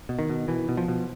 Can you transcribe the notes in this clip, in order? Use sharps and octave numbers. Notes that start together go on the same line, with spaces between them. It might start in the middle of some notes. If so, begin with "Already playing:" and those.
B2
D#3
B2
B2 E3
B2
F3
B2